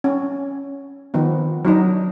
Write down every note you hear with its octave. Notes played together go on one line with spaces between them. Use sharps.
C#4
D#3 F3 B3
F#3 D4 D#4